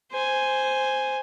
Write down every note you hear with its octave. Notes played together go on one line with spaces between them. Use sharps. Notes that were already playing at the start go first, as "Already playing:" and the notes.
C5 G#5